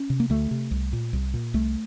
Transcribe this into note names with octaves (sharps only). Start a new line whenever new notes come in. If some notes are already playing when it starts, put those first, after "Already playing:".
Already playing: C#4
C3
A#3
D2 A3
C3
C2
A#2
C2
A#2
C2 A3